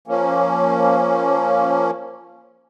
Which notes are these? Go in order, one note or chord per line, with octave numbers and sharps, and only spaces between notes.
F3 A#3 C#4